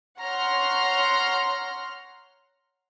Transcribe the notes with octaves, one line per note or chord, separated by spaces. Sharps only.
C#5 F#5 A#5 C6 F6